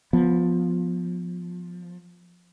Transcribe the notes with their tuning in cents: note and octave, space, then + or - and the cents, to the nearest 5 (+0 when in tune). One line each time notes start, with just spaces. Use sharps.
F3 +15 B3 +0